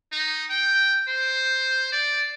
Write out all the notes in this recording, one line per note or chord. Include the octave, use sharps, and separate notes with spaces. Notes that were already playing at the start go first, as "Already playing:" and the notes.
D#4
G5
C5
D5